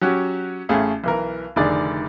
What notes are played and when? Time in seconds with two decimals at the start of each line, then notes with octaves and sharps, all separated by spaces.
0.01 F#3 C#4 F#4 G4
0.69 A1 A3 C#4 G#4 F5
1.04 B1 E3 A#4
1.56 F1 D3 D#3 G#4 D5